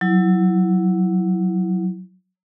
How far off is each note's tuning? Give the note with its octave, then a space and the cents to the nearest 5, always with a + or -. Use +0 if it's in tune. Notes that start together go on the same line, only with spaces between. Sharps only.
F#3 +0 E4 +0